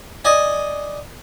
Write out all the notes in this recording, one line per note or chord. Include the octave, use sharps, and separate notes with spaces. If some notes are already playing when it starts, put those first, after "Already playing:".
D5 D#5 G#5